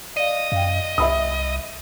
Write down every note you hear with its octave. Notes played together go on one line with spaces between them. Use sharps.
D5 D#5 F5
F#2 F5 G5
C2 E5 B5 D#6